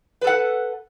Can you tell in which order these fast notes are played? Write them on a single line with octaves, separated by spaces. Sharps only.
B4 A4 F#5